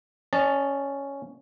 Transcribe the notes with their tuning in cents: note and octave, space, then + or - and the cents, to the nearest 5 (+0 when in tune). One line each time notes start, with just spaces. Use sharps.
C#4 +0 D5 +45 A5 +0